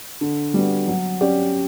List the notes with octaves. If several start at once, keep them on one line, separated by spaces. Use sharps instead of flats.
D3
G3 B3 F#4
F#3
C#4 G4 D5